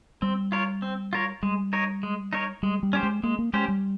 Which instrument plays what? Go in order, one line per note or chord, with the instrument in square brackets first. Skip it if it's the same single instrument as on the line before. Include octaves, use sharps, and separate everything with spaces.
[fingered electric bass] G3 [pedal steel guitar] C4
[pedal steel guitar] F4 A#4 C#5
C4
F4 A#4 C#5
[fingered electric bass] G3 [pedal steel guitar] G#3
[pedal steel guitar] D#4 A#4 C#5
G#3
D#4 A#4 C#5
[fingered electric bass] G3 [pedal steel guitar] G#3
[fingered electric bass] G3
[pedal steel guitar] C#4 G4 C5
[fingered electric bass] G#3
[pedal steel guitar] G#3 [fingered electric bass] A#3
[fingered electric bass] A#3
[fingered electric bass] G#3 [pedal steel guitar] C#4 G4 C5
[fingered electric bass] G3